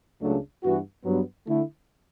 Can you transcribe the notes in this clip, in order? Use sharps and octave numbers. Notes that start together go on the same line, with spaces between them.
C#2 C#3 F#3 A3 D4
G2 E3 B3 F#4
G2 F#3 B3
D3 A3 E4